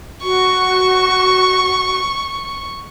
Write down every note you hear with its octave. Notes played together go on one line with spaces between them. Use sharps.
F#4 C#6